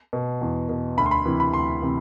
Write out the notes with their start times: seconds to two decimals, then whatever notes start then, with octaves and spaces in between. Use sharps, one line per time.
0.13 B2
0.41 E2
0.69 B2
0.97 D2 B5
1.06 C6
1.11 B5
1.25 C3 E3
1.40 B5
1.53 D2 C6
1.82 C3 E3